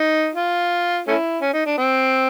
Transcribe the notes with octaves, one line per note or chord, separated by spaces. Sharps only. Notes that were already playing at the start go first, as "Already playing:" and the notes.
Already playing: D#4
F4
A3 C#4 E4
C#4
D#4
D4
C4